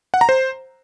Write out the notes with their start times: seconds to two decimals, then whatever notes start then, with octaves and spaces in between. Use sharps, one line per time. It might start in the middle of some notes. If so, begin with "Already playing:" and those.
0.14 F#5
0.21 A#5
0.29 C5